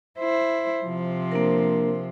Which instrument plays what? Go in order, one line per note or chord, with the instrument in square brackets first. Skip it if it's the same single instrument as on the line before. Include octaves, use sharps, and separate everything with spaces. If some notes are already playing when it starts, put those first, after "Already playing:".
[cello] E4 C5
C3 F3
[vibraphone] A#3 D4 A#4